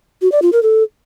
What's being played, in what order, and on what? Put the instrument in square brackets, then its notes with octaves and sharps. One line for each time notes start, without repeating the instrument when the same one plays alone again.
[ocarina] F#4
D5
F4
A#4
A4